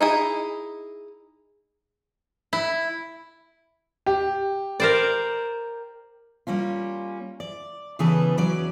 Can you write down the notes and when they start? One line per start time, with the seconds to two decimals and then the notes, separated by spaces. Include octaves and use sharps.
0.01 D#4 E4 G#4
2.53 E4
4.06 G4
4.80 A#4 C5 D5
6.47 G3 A#3 C#4 F4
7.40 D5
7.99 C#3 E3 B3 G#4 A4 B4
8.37 E2 F#3 C#4 D5